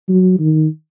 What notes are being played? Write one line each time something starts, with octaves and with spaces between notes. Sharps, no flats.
F#3
D#3